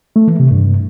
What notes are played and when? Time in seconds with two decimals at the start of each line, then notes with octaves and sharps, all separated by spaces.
0.16 A3
0.28 E3
0.39 C3
0.51 G2